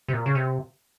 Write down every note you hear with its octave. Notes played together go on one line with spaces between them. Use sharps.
C3
A#2
C#3
C3